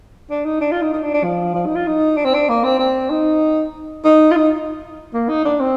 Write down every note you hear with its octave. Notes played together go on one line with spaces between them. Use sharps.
D4
D#4
D4
F4
D#4
D#4
D4
D4
F3
F3
D#4
F4
D#4
D4
C4
D4
A#3
C4
C4
D#4
D#4
F4
D#4
A#3
D#4
D4
C4